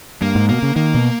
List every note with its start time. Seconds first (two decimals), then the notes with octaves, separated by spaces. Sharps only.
0.22 G2 A#3
0.35 G#2
0.49 B2 A#3
0.62 C#3
0.76 D#3 A#3
0.94 B2